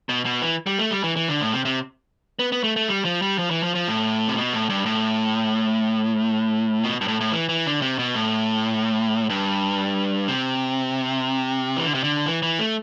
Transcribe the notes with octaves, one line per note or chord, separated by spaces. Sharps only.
B2
B2
E3
G3
A3
G3
E3
E3
D3
A2
C3
C3
B3
B3
A3
A3
G3
F3
G3
F3
E3
F3
F3
A2
C3
B2
A2
G2
A2
B2
G2
A2
A2
E3
E3
D3
C3
B2
A2
G2
C3
E3
D3
C3
D3
E3
E3
A3